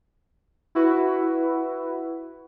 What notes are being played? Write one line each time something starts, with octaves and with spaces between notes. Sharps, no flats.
E4 F#4 B4